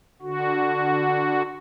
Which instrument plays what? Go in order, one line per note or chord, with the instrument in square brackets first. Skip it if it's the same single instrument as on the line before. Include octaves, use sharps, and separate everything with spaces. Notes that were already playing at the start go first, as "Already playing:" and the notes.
[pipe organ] D3 F#4